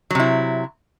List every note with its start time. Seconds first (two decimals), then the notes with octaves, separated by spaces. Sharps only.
0.11 F#3
0.15 C3
0.20 E4